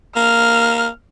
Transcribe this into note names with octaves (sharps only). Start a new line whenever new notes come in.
A#3 F6